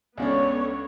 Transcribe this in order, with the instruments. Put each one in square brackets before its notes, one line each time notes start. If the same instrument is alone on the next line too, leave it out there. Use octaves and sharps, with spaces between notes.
[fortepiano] C#2 C#3 D4 [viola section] B3 A4 C#5